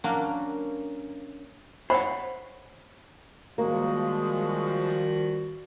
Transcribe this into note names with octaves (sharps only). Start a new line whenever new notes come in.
F#3 A#3 C#4 D4 F#4
C5 C#5 F#5 B5
D#3 F3 G3 G#3 A#3 F#4